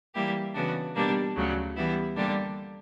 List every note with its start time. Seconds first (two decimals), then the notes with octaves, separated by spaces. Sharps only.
0.14 E3 G3 A#3 E4 G4
0.55 C#3 E3 B3 D4 F#4
0.95 B2 G3 A#3 D4
1.35 D2 C#3 F#3
1.76 E3 G3 B3 E4
2.16 D3 G3 A#3 D4 G4